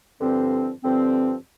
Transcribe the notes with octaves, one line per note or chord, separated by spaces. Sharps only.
G2 D3 F3 C4
G2 D3 F3 C4